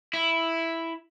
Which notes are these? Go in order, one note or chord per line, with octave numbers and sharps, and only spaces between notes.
E4